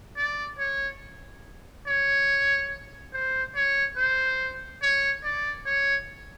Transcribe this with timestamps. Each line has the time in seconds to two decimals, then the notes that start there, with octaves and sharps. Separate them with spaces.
0.16 D5
0.58 C#5
1.87 C#5
3.13 C5
3.55 C#5
3.97 C5
4.82 C#5
5.24 D5
5.66 C#5